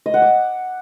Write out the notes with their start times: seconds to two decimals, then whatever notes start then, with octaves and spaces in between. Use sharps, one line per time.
0.06 D#5
0.14 F#5
0.22 D6